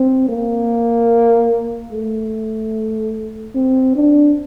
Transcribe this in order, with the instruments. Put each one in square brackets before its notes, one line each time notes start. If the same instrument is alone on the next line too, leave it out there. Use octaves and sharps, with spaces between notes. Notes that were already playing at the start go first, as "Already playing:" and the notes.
Already playing: [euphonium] C4
A#3
A3
C4
D4